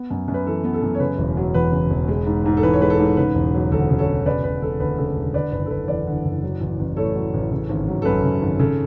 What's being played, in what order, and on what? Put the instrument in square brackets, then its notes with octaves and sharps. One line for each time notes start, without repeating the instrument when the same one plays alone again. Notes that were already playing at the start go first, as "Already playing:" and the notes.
Already playing: [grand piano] B3
F#2
F#2
B4
E3 A4
B3
A4
F#2
C#5
C#3 B4
E1
F#3
E2 B4
C#3
E1
G#3
G#2
G#2
A4
E3 B4
C#5
G#3 B4
A4
G#2
C#3 B4
E1
F#3
D2 A4
C#3
A4 C#5
E1
C#3 B4 D5
E1 B4
E1 A4
D2 B4
C#3 A4
B4
E1
D3 B4 D5
F#1 B4
A4
F#1 B4
E2 B4 D5
D3
F#1
F#3
A1
A1
A2 A4 C#5
F#3
A1
C#3
G#1
F#3
A4
F#2 B4
C#3
G#1
C#3 A4